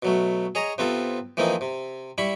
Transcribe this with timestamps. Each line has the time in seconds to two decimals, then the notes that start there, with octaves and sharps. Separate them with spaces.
0.02 B2 F#3 A3
0.55 G#4 C#5 D#5 A#5
0.78 C3 B3 C4 F4 A4
1.37 E3 F3 A3 A#3 C4 D#4
1.61 C3
2.18 G3 E4 B5 C#6